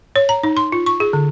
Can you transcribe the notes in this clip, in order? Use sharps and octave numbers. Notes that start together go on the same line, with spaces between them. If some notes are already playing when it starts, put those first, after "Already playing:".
C#5
A#5
D#4
C6
F4
C#6
G#4
D3